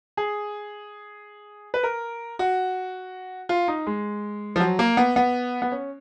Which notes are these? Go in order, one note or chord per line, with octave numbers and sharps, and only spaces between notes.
G#4
B4
A#4
F#4
F4
D#4
G#3
F3
F#3
A#3
B3
B3
B3
C#4